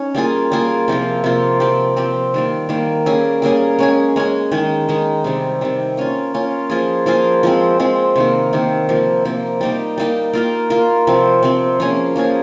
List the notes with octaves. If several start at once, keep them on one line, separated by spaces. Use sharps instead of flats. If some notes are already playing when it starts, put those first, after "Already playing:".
Already playing: C#4 D#4
G3 A#3 F4 G#4
G3 A#3 F4 G#4
C3 F3 A#3 F4
C3 F3 A#3 F4
F3 C4 G4
F3 C4 G4
D#3 G3 A#3
D#3 G3 A#3
G3 A#3 C#4 G#4
G3 A#3 C#4 G#4
G#3 C#4 G#4
G#3 C#4 G#4
D#3 G#3 D#4
D#3 G#3 D#4
C3 D#3 G3
C3 D#3 G3
A#3 C#4 F4
A#3 C#4 F4
F3 A#3 F4 G#4
F3 A#3 F4 G#4
F3 G#3 C4
F3 G#3 C4
C3 D#3 A#3
C3 D#3 A#3
C3 F3 A#3
C3 F3 A#3
G3 A#3 D#4 G4
G3 A#3 D#4 G4
A#3 F4 A#4
A#3 F4 A#4
C3 F3 C4
C3 F3 C4
F3 A#3 C#4 G#4
F3 A#3 C#4 G#4